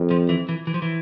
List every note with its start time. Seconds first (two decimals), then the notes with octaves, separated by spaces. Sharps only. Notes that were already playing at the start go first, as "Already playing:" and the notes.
Already playing: F2
0.11 F3
0.29 E3
0.49 E3
0.67 E3
0.74 F3
0.82 E3